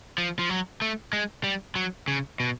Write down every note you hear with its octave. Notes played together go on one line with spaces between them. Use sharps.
F3
F3
F#3
A3
G#3
G3
F#3
C#3
B2